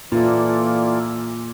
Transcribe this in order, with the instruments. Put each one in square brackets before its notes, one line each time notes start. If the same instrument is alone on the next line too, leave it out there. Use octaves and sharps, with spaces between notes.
[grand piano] A#2 [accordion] E3 A#3 F4 A4 D5